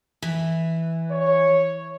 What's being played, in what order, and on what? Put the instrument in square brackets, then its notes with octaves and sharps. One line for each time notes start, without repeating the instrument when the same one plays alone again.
[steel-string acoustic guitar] E3
[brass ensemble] C#5